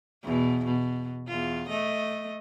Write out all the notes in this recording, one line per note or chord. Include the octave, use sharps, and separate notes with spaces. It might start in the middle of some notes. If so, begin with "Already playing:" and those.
E2 B2
B2
E2 F4
A3 D#5